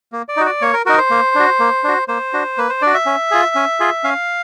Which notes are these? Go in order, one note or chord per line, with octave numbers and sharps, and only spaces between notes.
A#3
D5
D#4 F#4
D5
A#3 C#5
A#4
D#4 F#4 A#4
C5
A#3
D4 F#4
A#3
D4 F#4
A#3 C5
D4 F#4
A#3 B4
C5
D4 F#4 D5
E5
C#4
F4 G#4
C#4
F4 G#4
C#4 F5